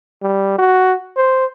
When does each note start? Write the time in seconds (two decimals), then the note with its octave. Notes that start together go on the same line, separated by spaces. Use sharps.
0.22 G3
0.58 F#4
1.17 C5